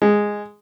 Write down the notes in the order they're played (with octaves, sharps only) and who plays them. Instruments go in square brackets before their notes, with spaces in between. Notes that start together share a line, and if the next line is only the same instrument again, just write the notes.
[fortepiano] G#3